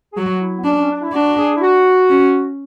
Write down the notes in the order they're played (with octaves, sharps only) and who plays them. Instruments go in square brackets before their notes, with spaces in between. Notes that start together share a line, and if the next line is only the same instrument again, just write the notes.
[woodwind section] G#4
[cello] F#3 [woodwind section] F#4
[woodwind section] E4
B3
[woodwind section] C#4 [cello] D4
[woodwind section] C#4
D4
E4
[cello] D4 [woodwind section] F#4
[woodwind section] G#4
E4
F#4
[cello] C#4